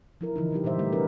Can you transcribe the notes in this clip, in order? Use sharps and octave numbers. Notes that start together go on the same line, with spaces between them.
F3 E4 A#4
D3 E3 F3 D#4
C3 F#3 D#4 G4
A#2 E3 G3 B3 C5 E5
G3 A3 G4
C#4 D#4 F#4 A#4 B4